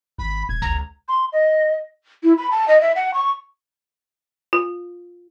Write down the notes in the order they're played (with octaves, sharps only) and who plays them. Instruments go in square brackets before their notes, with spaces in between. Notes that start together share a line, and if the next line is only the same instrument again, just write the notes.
[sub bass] G#1 [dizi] B5
[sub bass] D#1 [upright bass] A#2 [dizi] G#6
[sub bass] G1 [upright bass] C#2 [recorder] A#5
[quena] C6
D#5
E4
B5
A5
D#5
E5
F#5
C#6
[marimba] F4